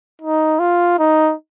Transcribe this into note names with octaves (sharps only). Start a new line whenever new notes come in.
D#4
F4
D#4